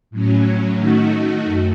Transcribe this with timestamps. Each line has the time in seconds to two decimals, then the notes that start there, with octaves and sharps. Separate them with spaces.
0.10 A2 F#3 C#4
0.78 D#3 A3 D#4 F#4
1.45 F#2